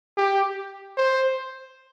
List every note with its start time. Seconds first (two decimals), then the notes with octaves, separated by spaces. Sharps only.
0.17 G4
0.97 C5